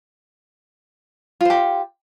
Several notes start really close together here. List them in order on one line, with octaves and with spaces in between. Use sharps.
F4 C5 G4